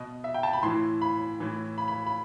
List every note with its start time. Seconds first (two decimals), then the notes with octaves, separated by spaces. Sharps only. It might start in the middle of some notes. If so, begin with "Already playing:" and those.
Already playing: B2 D#5
0.24 E5
0.34 G5
0.43 A5
0.53 B5
0.63 A2 E3 C6
1.02 B5
1.40 A2 E3
1.78 B5
1.88 B5
2.07 B5